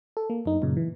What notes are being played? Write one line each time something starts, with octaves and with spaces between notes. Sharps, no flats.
A4
A#3
F#2 D#4
F#2 A#2 C#3
E3